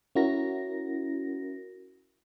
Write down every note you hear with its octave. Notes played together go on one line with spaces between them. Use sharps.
C#4 E4 F#4 A#4 A#6